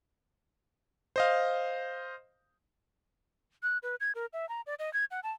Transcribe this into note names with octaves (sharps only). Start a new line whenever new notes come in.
C5 D#5 F5
F#6
B4
G#6
A#4
E5
A#5
D5
D#5
G#6
F#5
A5